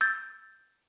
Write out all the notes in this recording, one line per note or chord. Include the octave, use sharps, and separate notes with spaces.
E6 G6 A6